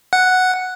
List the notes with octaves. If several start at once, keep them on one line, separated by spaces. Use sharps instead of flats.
F#5